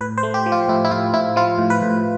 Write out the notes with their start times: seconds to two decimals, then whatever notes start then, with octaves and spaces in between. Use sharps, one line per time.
0.01 A2 B4
0.17 C5
0.23 A3
0.34 G4
0.46 F3
0.52 F4
0.68 A2 E4
0.85 E4
0.91 A2 F4
1.14 A2 E4
1.36 F3 F4
1.58 A2
1.70 B4
1.82 A2